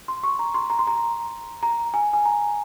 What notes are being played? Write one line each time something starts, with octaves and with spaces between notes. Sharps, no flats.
C6
C#6
A#5
C6
A#5
C6
A#5
A#5
G#5
G#5
A#5